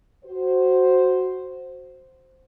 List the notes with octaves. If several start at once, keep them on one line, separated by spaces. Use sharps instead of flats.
F#4 C5